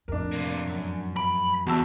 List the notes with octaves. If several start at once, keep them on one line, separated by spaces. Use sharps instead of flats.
F2 A2 D4 A#4
C3 A#3
F#2
B5 D7
E2 F#4 A5 E6